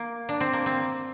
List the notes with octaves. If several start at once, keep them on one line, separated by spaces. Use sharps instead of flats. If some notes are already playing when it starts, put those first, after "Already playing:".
Already playing: A#3
D4
C4
A#3
C4